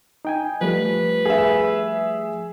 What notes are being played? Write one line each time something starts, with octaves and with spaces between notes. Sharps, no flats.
D#4 G5 G#5
F3 G3 A3 B4
G#4 E5